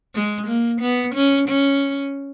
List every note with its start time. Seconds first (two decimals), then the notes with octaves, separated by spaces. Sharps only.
0.15 G#3
0.47 A#3
0.81 B3
1.15 C#4
1.48 C#4